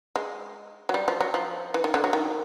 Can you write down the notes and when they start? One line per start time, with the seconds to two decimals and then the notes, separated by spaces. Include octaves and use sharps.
0.16 G#3
0.89 F#3
0.94 G3
1.08 F3
1.21 F#3
1.34 F3
1.74 E3
1.84 D#3
1.94 D3
2.04 F#3
2.13 D#3